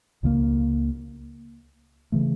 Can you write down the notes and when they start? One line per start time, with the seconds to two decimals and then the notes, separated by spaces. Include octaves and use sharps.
0.23 C#2 C#3 G3 A#3
2.12 C#3 E3 A3